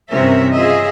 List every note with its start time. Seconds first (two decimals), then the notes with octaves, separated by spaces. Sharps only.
0.12 G2 C3 E3 C#4 A#4 E5
0.55 C#3 F4 G#4 D#5 E5